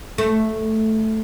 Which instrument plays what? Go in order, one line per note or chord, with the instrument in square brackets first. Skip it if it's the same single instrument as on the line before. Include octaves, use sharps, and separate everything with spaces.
[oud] A3